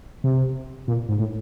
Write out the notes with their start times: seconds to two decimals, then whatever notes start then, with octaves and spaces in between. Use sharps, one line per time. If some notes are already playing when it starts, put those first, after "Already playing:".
0.24 C3
0.88 A#2
1.09 G#2
1.19 A2